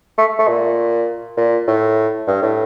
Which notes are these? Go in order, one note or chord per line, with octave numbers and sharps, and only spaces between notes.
A3
A3
A#2
A#2
A2
G2
A2